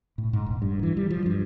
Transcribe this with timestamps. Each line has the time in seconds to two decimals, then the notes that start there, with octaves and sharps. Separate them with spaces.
0.18 A2
0.33 G#2
0.46 E1
0.62 G2
0.83 E3
0.97 G3
1.10 F3
1.26 G2